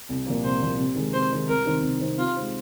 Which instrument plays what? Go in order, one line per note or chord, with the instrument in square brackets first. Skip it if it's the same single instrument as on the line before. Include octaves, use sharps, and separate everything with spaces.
[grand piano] C2
A#2 F3 A#3
[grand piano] C2 [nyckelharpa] C5
[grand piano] A#2 F3 A#3
C3
D#3 G#3
[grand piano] C3 [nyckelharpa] C5
[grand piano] D#3 G#3
[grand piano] C2 [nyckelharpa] A#4
[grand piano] C3 D#3 C4 D#4
C2
C3 D#3 C4 D#4
[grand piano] C3 [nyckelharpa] F4
[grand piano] G#3 C4 D#4